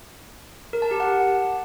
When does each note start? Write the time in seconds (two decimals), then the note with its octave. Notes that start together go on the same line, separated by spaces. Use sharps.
0.73 A#4
0.82 A5
0.91 G4
1.00 F#5